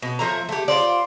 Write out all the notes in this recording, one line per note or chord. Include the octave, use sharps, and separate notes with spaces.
B2
F3 A3 E5 A#5
A3 G4
F4 F#4 C5 D5